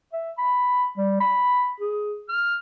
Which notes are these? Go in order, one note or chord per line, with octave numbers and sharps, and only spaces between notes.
E5
B5
G3
B5
G#4
F6